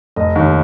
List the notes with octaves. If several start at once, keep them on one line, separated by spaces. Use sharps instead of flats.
F1 D#5
D#2